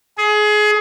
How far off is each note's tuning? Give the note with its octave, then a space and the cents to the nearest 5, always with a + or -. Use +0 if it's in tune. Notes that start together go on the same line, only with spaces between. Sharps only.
G#4 +25